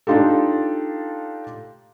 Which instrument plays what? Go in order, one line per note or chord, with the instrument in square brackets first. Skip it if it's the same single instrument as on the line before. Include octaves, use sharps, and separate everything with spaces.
[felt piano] D4 D#4 F4 G4 A4